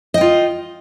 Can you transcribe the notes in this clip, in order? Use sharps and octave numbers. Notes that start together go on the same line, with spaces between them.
F4 D#5 G5